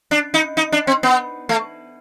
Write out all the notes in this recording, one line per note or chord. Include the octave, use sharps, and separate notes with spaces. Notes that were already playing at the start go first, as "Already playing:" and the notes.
D4
D#4
D#4
D4
C4
B3
A3